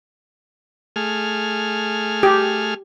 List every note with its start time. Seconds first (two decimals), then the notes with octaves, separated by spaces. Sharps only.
0.96 A3 G#4 F6
2.23 G4